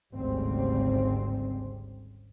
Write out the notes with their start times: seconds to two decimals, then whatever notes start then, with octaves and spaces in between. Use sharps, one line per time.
0.13 G#1 D2 C#3 G3 C4